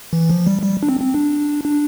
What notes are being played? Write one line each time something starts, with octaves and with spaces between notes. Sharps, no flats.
E3
F3
G3
G3
D4
C4
C4
D4
D4